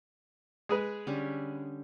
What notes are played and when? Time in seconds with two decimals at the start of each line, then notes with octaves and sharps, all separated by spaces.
0.69 G#3 G#4 B4
1.07 D3 G3 C#4